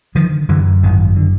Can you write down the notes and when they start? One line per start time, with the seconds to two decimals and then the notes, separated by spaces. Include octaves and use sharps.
0.15 D3 D#3 F3
0.49 F#2 D3 E3
0.83 G#1 D#3
1.16 D3